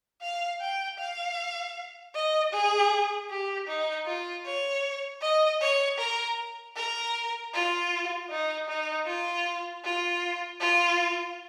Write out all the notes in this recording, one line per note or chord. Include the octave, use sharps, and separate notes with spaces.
F5
G5
F5
D#5
G#4
G4
D#4
F4
C#5
D#5
C#5
A#4
A#4
F4
D#4
D#4
F4
F4
F4